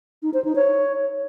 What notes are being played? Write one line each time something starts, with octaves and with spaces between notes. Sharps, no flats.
D#4
C5
D#4
C#5